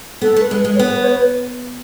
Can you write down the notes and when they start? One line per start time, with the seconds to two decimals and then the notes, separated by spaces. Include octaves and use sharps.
0.21 B3 A4
0.36 A3
0.41 B4
0.51 G#3
0.65 G#3
0.75 C#5
0.79 B3 B4
0.93 B4
1.04 C#5
1.08 B4